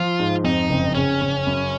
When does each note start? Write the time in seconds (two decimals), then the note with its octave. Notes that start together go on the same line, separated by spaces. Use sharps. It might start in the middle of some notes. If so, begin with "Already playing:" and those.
Already playing: F3 F4
0.19 G#2
0.44 F2 D#4
0.70 F#1
0.95 C#3 C#4
1.21 C#3
1.46 F#2